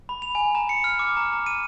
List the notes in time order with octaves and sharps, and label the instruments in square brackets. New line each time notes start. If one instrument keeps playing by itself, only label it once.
[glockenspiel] B5
F7
G#5
A#5
C#7
F6
D6
A#5
A#5
D#7